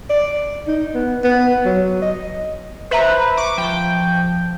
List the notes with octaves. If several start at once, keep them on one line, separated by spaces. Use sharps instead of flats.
D5
D#4
B3
B3
F#3
D#5
B4 C5 E5 A#5
C#6 D6
F3 G5